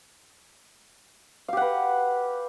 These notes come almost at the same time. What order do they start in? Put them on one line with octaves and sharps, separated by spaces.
F5 G4 F#5 B4